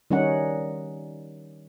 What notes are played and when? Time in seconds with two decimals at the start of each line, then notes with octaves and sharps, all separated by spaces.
0.10 D#3 G3 C#4 D#4 F#5